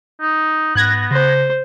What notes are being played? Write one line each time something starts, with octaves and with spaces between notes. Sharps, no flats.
D#4
G#2 B3 F#6 G#6 A#6
C#3 C5